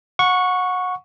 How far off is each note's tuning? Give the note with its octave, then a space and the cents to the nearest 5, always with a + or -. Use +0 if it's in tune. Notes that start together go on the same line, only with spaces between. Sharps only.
F#5 -25 C#6 +0